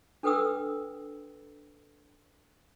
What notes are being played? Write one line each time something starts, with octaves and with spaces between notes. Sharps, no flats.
D4 A4 B4 G5 D#6 E6